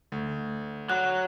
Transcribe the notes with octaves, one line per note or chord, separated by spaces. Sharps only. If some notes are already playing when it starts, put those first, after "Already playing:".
D2
F#3 F#6